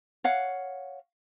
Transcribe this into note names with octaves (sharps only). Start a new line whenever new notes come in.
C#5 F5 F#5